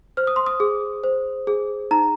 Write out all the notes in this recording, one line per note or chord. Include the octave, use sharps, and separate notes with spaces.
C5 F6
D#6
C6
D#6
G#4
C5
G#4
D#4 A#5